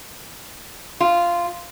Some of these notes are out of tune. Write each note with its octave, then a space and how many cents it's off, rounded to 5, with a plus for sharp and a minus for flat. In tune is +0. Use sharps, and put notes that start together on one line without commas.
F4 -10